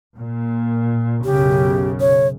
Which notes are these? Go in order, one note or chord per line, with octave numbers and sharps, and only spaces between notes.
A#2
B1 F#2 C#3 G4
C#5